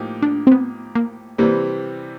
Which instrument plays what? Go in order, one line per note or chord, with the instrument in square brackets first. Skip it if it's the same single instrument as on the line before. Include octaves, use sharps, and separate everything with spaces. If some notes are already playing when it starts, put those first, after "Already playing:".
Already playing: [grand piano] A2 F3 A#3 D#4 G4
[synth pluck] D4
C4
B3
A#3
[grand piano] C3 E3 G3 C4 [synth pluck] A#3